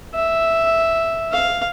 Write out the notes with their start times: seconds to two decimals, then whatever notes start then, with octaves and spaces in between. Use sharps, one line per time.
0.14 E5
1.32 F5